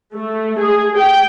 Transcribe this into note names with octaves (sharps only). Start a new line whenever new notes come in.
A3
G#4
G5